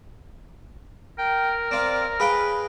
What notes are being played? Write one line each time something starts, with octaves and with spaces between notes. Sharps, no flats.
A#4 G5
C4 D5 F5
G#4 B4 F5 G5 B5